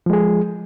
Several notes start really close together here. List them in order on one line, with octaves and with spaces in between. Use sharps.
F3 G#3 G#4